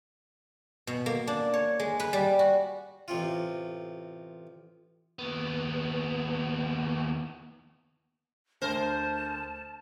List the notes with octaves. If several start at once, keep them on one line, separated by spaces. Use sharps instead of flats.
B2
A#3
D4
C#5
G#3
B4
G3
F#4
A1 C3 F4
D#2 B3
D2 A#4 C5 A5